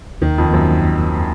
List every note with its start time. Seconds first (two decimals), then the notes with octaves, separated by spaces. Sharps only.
0.22 D#2 D#3
0.38 F2
0.45 D#3
0.51 F#2 A#3